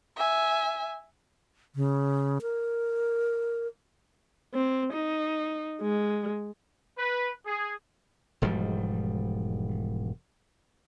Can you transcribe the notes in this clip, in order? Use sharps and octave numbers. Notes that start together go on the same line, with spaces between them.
E5 G#5
C#3
A#4
C4
D#4
G#3
B4
G#4
E1 G#2 F3 G3